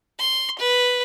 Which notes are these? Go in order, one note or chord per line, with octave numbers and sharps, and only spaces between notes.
C6
B4